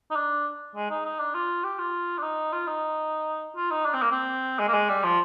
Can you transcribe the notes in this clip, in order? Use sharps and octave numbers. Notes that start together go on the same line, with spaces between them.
D#4
D4
G#3
D#4
D#4
D4
F4
G4
F4
D4
D#4
F4
D#4
F4
D#4
D4
C4
A#3
C4
G#3
A#3
G#3
G3
F3